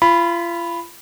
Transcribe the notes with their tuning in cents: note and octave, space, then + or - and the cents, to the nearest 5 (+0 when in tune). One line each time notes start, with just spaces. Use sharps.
F4 -35 B5 +0